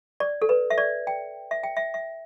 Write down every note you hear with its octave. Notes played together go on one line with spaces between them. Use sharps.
D5
A4
B4
E5
D5
G5
E5
G5
E5
E5